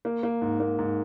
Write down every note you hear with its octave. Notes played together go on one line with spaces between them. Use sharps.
A#3
A#3
G#2
A#3
G#2